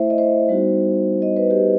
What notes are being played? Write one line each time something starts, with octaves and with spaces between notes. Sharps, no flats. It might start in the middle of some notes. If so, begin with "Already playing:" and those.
Already playing: A3 E4 C5 E5
D#5
C5
G3 B3 D#4 F#4
D#5
B4
G4